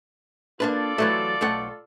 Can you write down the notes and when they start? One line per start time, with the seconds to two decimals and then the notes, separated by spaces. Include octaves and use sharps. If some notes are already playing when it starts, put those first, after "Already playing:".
0.60 A#3 D4 F4 A4 B4 D5
0.98 E3 F#3 A3
1.41 B1 A3 F#5